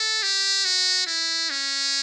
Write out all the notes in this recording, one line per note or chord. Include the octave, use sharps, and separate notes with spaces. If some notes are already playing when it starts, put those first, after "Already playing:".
Already playing: A4
G4
F#4
E4
C#4